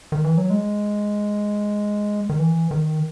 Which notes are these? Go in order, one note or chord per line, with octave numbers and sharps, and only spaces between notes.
D#3
E3
F#3
G#3
D#3
E3
D#3